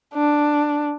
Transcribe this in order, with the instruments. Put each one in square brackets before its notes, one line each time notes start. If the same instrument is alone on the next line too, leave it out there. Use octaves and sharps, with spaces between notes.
[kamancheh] D4